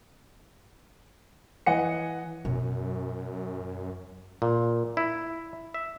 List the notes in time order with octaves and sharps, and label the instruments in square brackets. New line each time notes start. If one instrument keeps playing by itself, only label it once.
[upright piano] E3 D#5 F#5 G#5 C#7
[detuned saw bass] F#2 [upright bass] B2
[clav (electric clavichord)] A#2
E4
E5